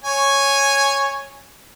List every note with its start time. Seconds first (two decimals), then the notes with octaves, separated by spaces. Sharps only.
0.04 C#5 G#5